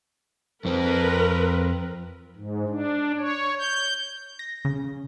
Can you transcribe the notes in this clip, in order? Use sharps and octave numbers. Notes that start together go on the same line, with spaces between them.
F2 C4 A#4 B4
G#2
D4
C#5
G6
A#6
C#3